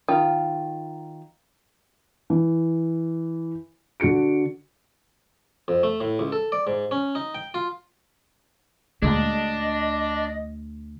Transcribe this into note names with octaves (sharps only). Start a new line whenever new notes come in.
D#3 F4
E3
D3 D4 F#4 C#7 D7
F2
A3
A2
C#2
A4
D5
G#2
C#4
D#4
G5
F4
D2 A#2 D3 G#3 D4 D#5